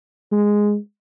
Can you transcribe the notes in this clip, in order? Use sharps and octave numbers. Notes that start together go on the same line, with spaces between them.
G#3